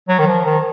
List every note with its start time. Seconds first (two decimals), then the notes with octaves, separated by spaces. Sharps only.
0.08 F#3
0.19 D#3
0.27 F3
0.45 D#3